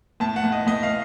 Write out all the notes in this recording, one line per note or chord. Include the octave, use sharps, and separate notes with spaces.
A2 A5
F#5
A2
D#5
A2 D#5
F5